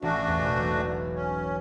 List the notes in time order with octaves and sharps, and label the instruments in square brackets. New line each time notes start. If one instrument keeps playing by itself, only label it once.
[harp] A1 [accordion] A3 D4 F#4
[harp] E2
E1
B1
[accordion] C#4